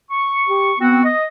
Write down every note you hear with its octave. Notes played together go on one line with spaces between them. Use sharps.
C#6
G4
B3 C4 F#4
D#5